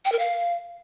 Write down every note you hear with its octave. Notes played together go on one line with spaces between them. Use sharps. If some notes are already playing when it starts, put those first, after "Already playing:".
G5
A#4
F5